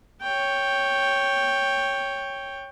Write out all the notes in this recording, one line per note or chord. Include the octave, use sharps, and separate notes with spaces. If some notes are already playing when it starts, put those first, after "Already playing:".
C#5 G5